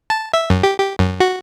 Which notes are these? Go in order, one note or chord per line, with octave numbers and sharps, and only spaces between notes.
A5
E5
F#2
G4
G4
F#2
F#4